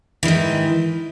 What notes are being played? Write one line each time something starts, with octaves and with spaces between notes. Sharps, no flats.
G#2 D#3 E3